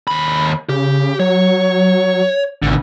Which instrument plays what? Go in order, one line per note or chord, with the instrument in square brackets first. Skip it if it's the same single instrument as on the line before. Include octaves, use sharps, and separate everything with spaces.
[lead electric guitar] D#2 B5
[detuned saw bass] C#3 [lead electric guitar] G4
[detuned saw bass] F#3 [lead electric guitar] C#5
[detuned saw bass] G#1 [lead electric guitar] B2 D3